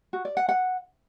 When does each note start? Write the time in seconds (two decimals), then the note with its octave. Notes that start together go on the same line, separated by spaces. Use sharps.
0.13 F#4
0.25 D5
0.37 F#5
0.49 F#5